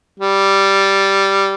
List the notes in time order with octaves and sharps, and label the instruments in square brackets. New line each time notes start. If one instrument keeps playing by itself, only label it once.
[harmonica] G3